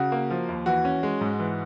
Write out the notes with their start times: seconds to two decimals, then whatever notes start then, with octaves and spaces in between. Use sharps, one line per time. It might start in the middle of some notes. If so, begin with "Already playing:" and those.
Already playing: C#3 F#4
0.12 A#3
0.30 F3
0.49 D#2
0.66 E3 F#4
0.85 C#4
1.03 G#3
1.21 G#2
1.39 E3